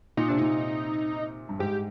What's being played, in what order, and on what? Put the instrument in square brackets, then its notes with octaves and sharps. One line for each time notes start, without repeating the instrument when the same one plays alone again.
[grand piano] A#2 [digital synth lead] D#4
[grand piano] C3 [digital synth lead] D4
[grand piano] A#2 [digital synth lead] D#4
[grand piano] G2
[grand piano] G#2 [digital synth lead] G4